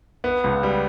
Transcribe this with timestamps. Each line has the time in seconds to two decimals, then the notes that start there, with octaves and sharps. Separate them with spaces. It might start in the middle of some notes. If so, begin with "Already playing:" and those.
0.24 B3
0.44 C#2
0.63 G3